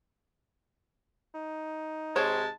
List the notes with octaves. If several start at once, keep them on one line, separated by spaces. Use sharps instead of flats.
D#4
G#2 C3 G#3 C5 C#5 G5 A5